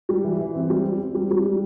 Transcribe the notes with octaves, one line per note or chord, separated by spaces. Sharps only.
G3
E3
E3
C4
G3
C4
C4
G3
G3
G3